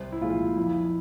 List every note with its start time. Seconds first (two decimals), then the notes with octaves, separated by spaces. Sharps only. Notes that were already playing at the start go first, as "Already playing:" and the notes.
Already playing: C2 C5
0.12 E4
0.21 A#2 F3 G#3 F4
0.57 F2 E4